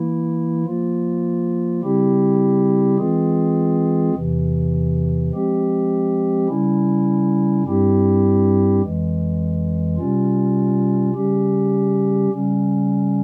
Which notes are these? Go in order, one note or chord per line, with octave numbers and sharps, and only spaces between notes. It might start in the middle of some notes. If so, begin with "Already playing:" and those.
Already playing: E3 A#3 E4
F3 A#3 F4
C#3 G3 C4 E4 G4
E3 G#3 C4 F4 G#4
E2 C3 E3
F3 G#3 C4 G4
C#3 G3 C#4 E4
G2 G3 C4 E4 G4
F2 E3 G#3
C3 G3 C#4 F4
C#3 G3 C#4 G4
C#3 G3 C#4